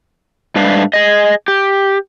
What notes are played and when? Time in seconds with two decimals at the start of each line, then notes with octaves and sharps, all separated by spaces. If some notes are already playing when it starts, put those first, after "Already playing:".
0.56 G#2 G3 A3 D4 B4 F5
0.93 G#4 D#5
1.48 G4